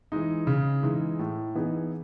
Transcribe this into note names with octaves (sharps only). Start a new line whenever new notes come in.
E3 G#3 D#4
C#3
E3 G#3 D#4
A2
E3 B3 D#4 G#4